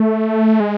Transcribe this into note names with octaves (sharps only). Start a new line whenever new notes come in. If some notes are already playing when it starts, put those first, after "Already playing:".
Already playing: A3
G#3